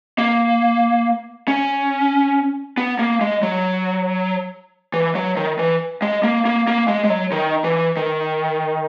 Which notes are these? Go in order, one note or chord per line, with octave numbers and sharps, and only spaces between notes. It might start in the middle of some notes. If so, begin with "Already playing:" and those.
A#3
C#4
B3
A#3
G#3
F#3
E3
F#3
D#3
E3
G#3
A#3
A#3
A#3
G#3
G#3
F#3
D#3
E3
D#3